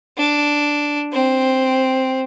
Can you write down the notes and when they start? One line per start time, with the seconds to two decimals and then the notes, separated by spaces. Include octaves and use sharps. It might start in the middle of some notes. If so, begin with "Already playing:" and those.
0.18 D4
1.12 C4